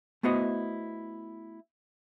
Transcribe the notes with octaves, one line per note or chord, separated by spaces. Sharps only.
A3 B3 E4 F#4 C5 D#5